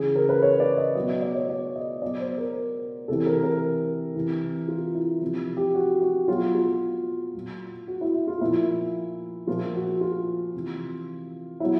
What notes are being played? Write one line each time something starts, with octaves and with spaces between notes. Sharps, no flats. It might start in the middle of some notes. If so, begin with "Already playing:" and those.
Already playing: C#3 E3 G#4
A#4
B4
C#5
D5
D#5
B2 F#3 D#5
D#5
D5
C#5
D5
D#5
B2 F#3 D5
C5
A#4
C3 E3 A4
A#4
A#4
C3 E3
F4
E4
C3 F3 E4
G4
F#4
F#4
B2 F#3 F4
F4
A#2 F#3
F#4
E4
E4
F4
A#2 F3 E4
A#2 F3 F4
F#4
F4
C3 E3
B2 F#3 E4